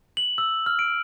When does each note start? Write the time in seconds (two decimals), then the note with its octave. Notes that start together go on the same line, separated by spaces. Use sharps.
0.17 F#7
0.38 E6
0.66 F6
0.79 D7